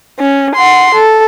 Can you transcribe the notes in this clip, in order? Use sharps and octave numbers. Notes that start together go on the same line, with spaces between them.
C#4
F#5 C6
A4